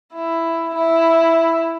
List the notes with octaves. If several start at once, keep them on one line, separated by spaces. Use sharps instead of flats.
E4
E4